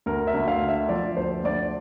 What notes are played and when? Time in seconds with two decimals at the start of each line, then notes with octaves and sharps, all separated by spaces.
0.06 D2 A#4
0.27 E5
0.34 D2
0.48 F5
0.62 D3
0.68 E5
0.89 F3 D5
1.17 D2 C5
1.44 D2 D5